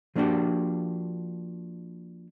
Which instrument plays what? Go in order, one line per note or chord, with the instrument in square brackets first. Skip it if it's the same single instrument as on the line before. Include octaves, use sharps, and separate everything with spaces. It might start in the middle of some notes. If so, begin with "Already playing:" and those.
[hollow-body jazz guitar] F3 A#3 B3 D4 F#4 G4